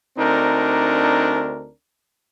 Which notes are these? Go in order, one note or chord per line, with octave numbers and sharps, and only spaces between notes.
D2 C4 D4 D#4 A#4